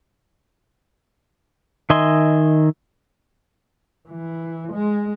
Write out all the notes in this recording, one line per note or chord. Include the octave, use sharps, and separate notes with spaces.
D#3 D#5 E5 G#5 C6
E3
G#3